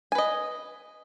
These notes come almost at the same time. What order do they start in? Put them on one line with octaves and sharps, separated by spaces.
G#5 B4 D#5